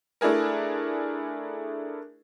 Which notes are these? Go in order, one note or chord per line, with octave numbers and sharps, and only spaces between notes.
A3 D4 E4 G#4 A#4